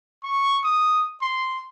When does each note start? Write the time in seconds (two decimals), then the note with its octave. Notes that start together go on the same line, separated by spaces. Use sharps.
0.23 C#6
0.64 D#6
1.22 C6